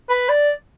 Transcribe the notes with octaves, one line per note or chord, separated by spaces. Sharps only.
B4
D5